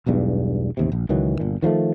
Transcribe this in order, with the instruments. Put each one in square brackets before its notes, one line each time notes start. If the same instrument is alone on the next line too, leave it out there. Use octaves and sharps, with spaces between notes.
[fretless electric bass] E1 B1 E2 G2
A1 D#2 C3
A#1
C#2 D#3 E3 F#3
G1 A#2
D#3 F3 F#3 A3